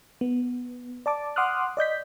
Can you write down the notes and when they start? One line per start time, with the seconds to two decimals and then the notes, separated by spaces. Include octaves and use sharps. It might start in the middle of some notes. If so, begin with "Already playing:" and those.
0.21 B3
1.06 D5 A5 D6
1.36 F#5 C6 D6 D#6 F6 F#6
1.77 D5 D#5 G6 B6